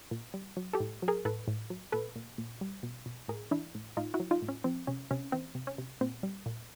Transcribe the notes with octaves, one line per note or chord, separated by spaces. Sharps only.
A#2
G3
F#3
G4 A4
A2
F#3
G#4 A#4
A2 A4 B4
A2
F#3
A#2 A4 B4
A#2
A#2
G3
B2
B2
A2 G#4 A#4
E3 D4 E4
A2
A2 D#4 F4
E4 F#4
F#3
D#4 F4
A2
C#4
F3 C4
C3 C#4
C3 C#4
E3 C4
C3
C#4
C3
A#2 C4
G3
A#2